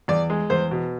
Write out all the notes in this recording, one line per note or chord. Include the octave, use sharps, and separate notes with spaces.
E2 D5
G#3
E2 C5
B2